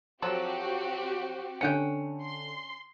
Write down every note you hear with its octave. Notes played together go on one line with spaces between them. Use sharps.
F3 F#3 C4 F#4 G4 A4
D3 C#4 F#5 G5 C#7
C6